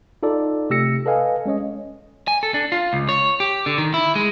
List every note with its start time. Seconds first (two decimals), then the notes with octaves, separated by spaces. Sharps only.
0.23 D#4 F4 A4 D5
0.70 C3 A3 G4 E6 A#6 C#7
1.06 A4 B4 D#5 F5 G#5
1.46 G#3 C#4 C#5 D#5
2.28 G#5
2.43 A4
2.54 D4
2.72 F4
2.93 C#2
3.09 C#5
3.40 G4
3.66 D3
3.78 D#3
3.94 E4
4.15 G#3